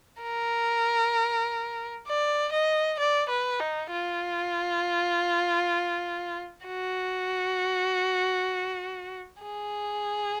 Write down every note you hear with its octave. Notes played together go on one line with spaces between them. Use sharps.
A#4
D5
D#5
D5
B4
D#4
F4
F#4
G#4